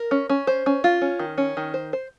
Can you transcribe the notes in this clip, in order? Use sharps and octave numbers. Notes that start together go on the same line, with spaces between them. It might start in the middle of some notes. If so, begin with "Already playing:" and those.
Already playing: A#4
C#4
C#4
C5
C#4
F4
C#4
D#3
C#4
D#3
C5
C5